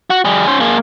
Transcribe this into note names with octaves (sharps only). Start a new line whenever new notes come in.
F#4
G3 G#4
C#4 C5
A#3 G#4